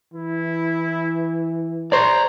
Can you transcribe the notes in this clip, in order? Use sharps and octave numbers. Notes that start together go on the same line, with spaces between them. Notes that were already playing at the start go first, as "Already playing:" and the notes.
E3 E4
C5 D5 A#5